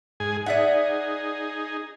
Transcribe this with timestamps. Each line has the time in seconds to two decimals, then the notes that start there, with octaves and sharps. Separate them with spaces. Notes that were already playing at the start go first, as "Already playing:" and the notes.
0.20 G#2 G#4 G#5
0.46 D#4 G#4 D5 E5 F#5